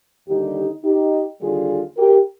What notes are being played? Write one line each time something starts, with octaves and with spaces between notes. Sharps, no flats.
D#2 D3 G3 D#4 G4
D#4 G4
D#2 D3 G3 F4 G#4
G4 A#4